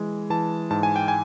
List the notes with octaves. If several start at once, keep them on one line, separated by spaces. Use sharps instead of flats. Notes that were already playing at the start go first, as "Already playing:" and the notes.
Already playing: E3 G#3
E3 A5
G#2 A5
G#5
G5
G#5